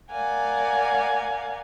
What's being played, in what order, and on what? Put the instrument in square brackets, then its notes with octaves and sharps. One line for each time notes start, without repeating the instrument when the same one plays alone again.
[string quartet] A#4 D5 F5 F#5 G#5